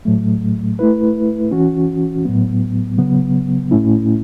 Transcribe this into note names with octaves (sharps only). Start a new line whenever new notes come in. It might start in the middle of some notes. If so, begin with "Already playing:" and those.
A2 F#3 A3
A3 E4 B4
E3 C#4 F#4
A2 F#3 B3
C#3 F#3 B3
A2 A3 C#4 E4